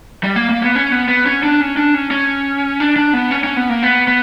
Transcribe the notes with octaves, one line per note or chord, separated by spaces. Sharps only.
G3
A#3
A#3
B3
C#4
B3
B3
C#4
D4
C#4
D4
C#4
C#4
D4
D4
B3
C#4
C#4
B3
A#3
B3
B3